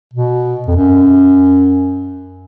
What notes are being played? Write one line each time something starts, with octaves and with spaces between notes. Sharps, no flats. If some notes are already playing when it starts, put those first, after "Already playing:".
B2
F2
F#2